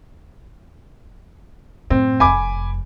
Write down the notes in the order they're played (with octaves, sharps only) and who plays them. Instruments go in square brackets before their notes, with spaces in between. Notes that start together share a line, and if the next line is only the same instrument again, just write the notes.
[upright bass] F#2 A2 [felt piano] C4
[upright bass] F1 F2 [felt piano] G#5 B5 D6